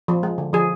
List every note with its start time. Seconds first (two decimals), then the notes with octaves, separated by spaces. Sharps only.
0.08 F3
0.23 G#3
0.38 D3
0.53 F3 G#4